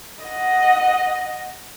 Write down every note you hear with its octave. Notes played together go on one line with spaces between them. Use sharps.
D#5 F#5